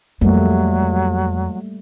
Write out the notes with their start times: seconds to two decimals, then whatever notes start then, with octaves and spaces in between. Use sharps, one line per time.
0.21 F2 F#3 G3 A3 A#3